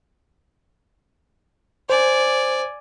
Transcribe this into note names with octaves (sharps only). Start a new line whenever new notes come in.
C5 D5 G#5